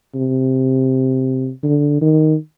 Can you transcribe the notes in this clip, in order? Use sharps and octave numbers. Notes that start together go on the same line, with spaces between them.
C3
D3
D#3